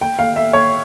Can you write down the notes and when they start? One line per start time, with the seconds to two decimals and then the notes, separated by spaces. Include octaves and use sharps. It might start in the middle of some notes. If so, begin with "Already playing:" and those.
0.01 G5
0.19 F5
0.36 E5
0.53 C#5